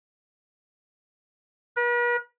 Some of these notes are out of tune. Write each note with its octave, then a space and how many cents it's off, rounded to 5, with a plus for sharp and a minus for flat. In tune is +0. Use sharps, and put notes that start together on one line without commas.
B4 -45